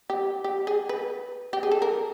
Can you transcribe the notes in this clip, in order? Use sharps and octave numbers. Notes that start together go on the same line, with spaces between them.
G4
G4
G#4
B4
G4
G#4
A4
A#4